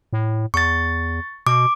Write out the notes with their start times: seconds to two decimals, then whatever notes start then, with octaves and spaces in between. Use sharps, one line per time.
0.13 A2
0.54 E2 C#6 A6
1.47 B2 D6